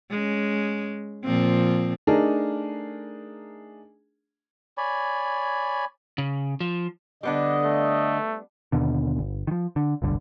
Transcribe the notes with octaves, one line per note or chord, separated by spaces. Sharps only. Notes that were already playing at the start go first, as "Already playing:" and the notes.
G#3 C#4
A#2 F3 C4
A3 D4 D#4 G#4 A#4
C#5 D5 G#5 B5
C#3
F3
D3 G3 B3 D4 D#5
A3
D#2 B2 D3
G1
D#3 F3
D3
F1 B1 G2 D3